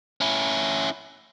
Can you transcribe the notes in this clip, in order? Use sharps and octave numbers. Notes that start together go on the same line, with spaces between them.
C#4 E4